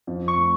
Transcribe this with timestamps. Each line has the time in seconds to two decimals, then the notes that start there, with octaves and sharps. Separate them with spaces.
0.07 F2
0.28 C#6
0.38 A3